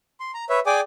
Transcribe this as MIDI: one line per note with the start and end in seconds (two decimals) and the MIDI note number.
0.20 0.31 84
0.34 0.45 82
0.49 0.60 71
0.49 0.60 73
0.49 0.60 76
0.66 0.81 68
0.66 0.81 74
0.66 0.81 79
0.66 0.81 80
0.66 0.81 86